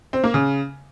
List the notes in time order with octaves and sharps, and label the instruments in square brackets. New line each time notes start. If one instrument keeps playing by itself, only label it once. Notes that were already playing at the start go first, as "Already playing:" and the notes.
[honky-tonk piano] C4
A#3
C#3